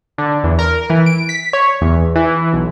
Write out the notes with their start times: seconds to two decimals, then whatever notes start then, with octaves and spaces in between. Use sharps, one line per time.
0.18 D3
0.43 E2
0.59 A#4
0.90 E3
1.06 D7
1.29 B6
1.53 C#5
1.81 E2
2.16 E3
2.53 B1